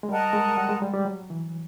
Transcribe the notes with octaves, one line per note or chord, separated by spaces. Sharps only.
G#3
G3 A#4 D#5 F#5 A5
G#3
G3
G#3
G3
G3
F#3
E3